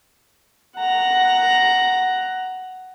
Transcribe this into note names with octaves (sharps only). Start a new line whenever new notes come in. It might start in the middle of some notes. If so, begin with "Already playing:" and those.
F#5 A#5